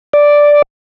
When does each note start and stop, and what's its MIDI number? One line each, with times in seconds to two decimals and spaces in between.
0.13 0.62 74